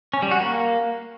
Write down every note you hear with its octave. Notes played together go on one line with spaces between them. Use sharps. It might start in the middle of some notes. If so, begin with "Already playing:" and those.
C#4
G3
F#4
A#3